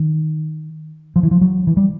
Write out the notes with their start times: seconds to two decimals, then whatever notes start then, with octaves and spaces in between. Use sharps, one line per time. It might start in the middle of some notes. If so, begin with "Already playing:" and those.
Already playing: D#3
1.16 F3
1.23 E3
1.31 F3
1.41 F#3
1.67 E3
1.77 G3